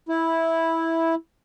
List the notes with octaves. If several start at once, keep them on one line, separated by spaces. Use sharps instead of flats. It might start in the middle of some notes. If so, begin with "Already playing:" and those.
E4